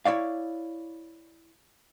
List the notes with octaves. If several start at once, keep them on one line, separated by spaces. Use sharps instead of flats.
E4 C#5 D5 F5